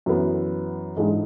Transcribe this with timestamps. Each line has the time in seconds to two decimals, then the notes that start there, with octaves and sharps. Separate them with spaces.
0.06 F#2 E3 B3
0.97 G#2 E3 G#3 D4